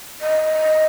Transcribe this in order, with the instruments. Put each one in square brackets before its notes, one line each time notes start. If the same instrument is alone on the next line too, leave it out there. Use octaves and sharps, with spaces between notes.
[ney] D#5